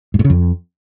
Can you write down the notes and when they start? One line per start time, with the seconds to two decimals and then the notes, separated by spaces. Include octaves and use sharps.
0.14 G#2
0.19 A2
0.25 C#3
0.30 F2